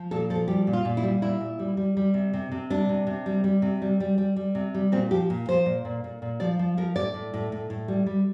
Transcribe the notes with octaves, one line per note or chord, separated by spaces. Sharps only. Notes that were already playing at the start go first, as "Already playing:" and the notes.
Already playing: F3
A#2 A4
F3 A4
G3 G4
A#2
F4
A#2
E4
G3
A#2 E4
A#2
G3
G3
G3
C3
C3
C3
G3 D4
C3
C3
G3
G3
C3
G3
G3
G3
G3
C3
G3
A#2 C4
F3 G4
A#2
F3 C5
A#2
A#2
A#2
A#2
F3 D5
F3
F3 A#4
A2 D5
A2
A2
A2
A2
G3
G3